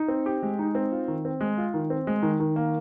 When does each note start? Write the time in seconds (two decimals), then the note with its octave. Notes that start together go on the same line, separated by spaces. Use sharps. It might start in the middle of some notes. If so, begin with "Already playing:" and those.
Already playing: D#4
0.08 C4
0.26 G4
0.43 G#3
0.59 D#4
0.75 C4
0.92 F4
1.08 D#3
1.25 C4
1.41 G#3
1.58 F4
1.74 D#3
1.90 C4
2.07 G#3
2.23 D#3
2.40 D#3
2.56 A#3